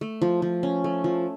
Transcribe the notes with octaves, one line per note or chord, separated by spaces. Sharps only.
A3
F3
F3
C#4
A3
F3